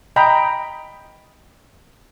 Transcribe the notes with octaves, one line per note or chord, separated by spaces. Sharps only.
D#5 G5 A#5 B5